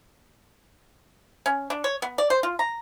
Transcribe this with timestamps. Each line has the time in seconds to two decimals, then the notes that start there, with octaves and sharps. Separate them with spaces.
1.46 C#4
1.70 D4
1.84 C#5
2.02 B3
2.18 D5
2.30 C5
2.43 F4
2.59 A#5